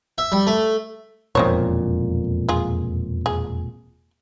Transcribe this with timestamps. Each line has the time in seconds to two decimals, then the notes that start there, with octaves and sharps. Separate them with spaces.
0.18 E5
0.32 G3
0.47 A3
1.35 E1 F2 A#2 D#3 C5 C#5
2.49 F4 G#4
3.26 G#4